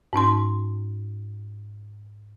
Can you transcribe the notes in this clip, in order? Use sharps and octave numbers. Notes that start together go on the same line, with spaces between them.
G#2 C#4 D#4 C6